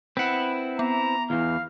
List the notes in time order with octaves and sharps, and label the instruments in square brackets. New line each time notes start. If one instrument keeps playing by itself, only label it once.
[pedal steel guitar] C4 E4 [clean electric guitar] B4 F#5
[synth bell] B3 [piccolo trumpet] A#5
[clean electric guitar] E2 E3 [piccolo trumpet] F5